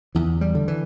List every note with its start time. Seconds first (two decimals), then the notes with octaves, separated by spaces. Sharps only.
0.15 E2 E3
0.41 G3
0.55 D3
0.68 E3